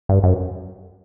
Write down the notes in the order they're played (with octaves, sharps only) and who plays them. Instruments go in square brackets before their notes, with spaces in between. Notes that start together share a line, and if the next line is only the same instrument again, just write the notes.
[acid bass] G2
F#2